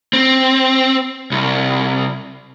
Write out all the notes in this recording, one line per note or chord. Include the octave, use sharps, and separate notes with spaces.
C4
C2